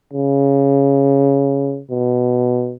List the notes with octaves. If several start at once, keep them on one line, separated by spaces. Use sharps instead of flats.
C#3
B2